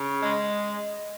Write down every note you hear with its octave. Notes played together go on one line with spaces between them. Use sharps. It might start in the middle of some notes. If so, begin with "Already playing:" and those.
Already playing: C#3
G#3